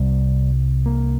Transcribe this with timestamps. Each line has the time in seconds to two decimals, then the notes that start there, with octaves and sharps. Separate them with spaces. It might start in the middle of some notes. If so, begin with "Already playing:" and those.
Already playing: C2 C3 G3
0.86 A#3